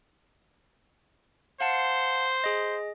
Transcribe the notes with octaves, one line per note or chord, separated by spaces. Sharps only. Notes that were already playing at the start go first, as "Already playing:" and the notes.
C5 F5 F#5 A5
G#4 D#5